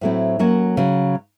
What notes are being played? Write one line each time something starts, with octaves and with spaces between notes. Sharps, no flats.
A2 F#3 A3 C4 E4
F#3 A#3 C#4 F#4
C#3 F#3